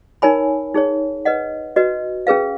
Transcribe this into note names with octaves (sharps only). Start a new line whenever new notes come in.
D#4 A#4 C#5 G#5 B5
D#4 G#4 C#5
B4 D#5 F#5
F#4 B4 D#5
C#4 G#4 B4 F5